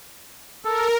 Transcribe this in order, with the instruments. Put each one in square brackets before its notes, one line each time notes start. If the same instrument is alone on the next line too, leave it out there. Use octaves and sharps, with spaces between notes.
[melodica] A4 [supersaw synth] A#4